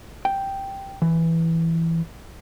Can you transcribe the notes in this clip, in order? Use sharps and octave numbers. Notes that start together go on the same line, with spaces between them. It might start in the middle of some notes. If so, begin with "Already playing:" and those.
G5
E3